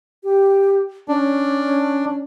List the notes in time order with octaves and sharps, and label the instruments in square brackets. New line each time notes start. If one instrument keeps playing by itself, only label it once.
[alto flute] G4
[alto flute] C#4 [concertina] D4